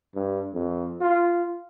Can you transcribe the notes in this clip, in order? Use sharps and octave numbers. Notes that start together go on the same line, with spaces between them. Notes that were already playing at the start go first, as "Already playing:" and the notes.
G2
F2
F4